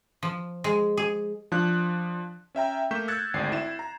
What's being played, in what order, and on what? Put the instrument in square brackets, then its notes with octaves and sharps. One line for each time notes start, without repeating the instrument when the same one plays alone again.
[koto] F3
G#3
G#4
[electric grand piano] F3 D4 F#6
C#4 E5 G5 A#5
A3 A#3 C#6 G6 B6 E7
E6 F#6 G#6 A6 C#7
G#1 D2 D5 C7
E4 E7
A#5